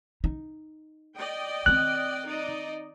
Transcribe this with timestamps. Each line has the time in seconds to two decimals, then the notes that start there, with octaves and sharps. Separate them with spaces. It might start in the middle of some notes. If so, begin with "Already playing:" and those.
0.24 D#4
1.16 D5 D#5 G5
1.66 D#3 C4 F#6
2.26 D#4 D5 D#5